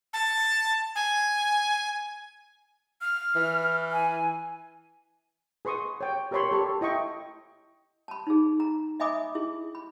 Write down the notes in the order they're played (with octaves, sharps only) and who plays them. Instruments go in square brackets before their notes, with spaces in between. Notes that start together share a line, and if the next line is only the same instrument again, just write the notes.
[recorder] A5
G#5
[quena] F6
[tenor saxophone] E3
[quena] G#5
[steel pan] G#4 B4 C6 C#6 D#6
C#5 G5
G4 A#4 B4 C#5 B5 C6
G4 A4 C#5 C#6
E4 D#5 G5 C#6
[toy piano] A5 B5
D#4 G#4
A#5
D#5 E5 G#5 B5 D6 D#6
E4 G#4
B5